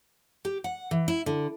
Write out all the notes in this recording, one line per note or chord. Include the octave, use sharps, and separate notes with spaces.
G4
F#5
E3
E4
D3